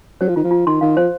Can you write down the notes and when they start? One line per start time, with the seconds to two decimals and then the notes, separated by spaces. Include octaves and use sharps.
0.21 F#3 C5
0.29 F3
0.36 D#3 F4
0.44 F3
0.51 F4
0.66 D#3 C6
0.81 D#3 F5
0.97 F3 C5